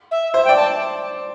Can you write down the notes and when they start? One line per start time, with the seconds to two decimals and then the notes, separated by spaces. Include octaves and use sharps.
0.11 E5
0.34 C5 E5
0.45 D5 G5
0.56 A5